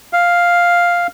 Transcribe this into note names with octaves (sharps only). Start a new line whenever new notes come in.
F5